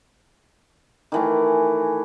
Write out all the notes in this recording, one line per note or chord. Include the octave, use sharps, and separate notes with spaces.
D#3 E3 A3